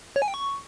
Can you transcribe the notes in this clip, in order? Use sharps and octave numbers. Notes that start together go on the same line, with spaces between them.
C#5
G#5
G5
C#6